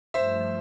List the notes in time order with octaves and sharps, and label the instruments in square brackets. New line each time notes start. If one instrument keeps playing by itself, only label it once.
[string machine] G2 F3 A3 [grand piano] C5 E5